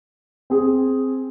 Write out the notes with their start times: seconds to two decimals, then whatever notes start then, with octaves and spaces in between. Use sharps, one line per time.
0.50 C4 G#4